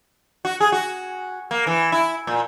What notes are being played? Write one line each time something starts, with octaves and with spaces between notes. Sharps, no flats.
F#4
G#4
F#4
A#3
E3
E4
A#2